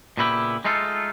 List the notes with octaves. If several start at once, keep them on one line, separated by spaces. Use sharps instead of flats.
A#2 C#3 B3 E4 F#4 G4
G#3 A3 D#4 F4 A4